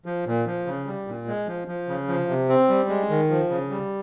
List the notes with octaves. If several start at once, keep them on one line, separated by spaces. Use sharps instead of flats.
F3
A#2
F3
C#3
G3
A#2
G#3
F3
F3
C#3
F3
C3
C4
G3
G#3
D#3
F3
C#3
G3